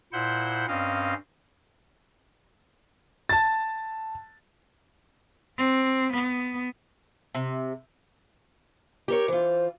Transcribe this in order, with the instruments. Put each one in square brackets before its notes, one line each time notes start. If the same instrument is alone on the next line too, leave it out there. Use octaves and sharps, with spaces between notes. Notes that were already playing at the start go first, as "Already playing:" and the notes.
[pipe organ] A#2 E4 C5 F#5 G6
G2 C4 C#4 D#5 F5
[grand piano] A5 A6
[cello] C4
B3
[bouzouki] C3
[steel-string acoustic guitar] G4 A#4 C#5
[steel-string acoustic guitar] E3 F4 [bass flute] C5